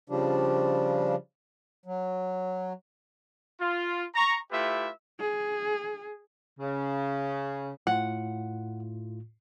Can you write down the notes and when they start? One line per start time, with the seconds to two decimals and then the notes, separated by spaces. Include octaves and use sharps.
0.09 C#3 F3 G3 D4
1.86 F#3
3.61 F4
4.15 A#5 C#6
4.52 A3 E4 F4 G4 B4 E5
5.20 G#4
6.60 C#3
7.87 A2 F4 F#5